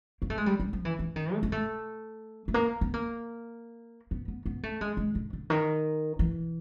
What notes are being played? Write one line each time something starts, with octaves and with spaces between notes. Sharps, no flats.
A#3
A3
G#3
G3
G3
F3
E3
E3
D#3
A3
A#3
A3
A3
A#3
B3
A#3
B3
B3
B3
A3
G#3
G#3
D3
D3
D#3
E3